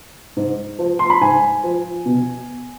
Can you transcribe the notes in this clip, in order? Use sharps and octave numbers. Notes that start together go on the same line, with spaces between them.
G#2
F3
C6
B5
G#2 G#5
F3
B2